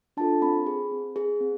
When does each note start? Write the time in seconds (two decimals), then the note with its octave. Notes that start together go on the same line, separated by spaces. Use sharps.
0.17 D4 F4 A4 A5
0.42 C4 B5
0.66 G#4
0.91 C4
1.16 G#4
1.41 C4